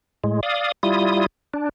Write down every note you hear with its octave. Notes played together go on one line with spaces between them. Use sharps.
A2 G#3
D5 F5 D#6
G3 E4 F4 D#6
D4